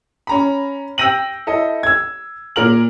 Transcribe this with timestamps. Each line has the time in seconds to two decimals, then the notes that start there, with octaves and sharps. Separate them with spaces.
0.27 C#4 A#5 B5
0.98 G5 E6 G6 A#6 D#7 F#7
1.47 E4 A4 D#5
1.83 E6 G#6
2.56 A#2 A#4 F6 F#7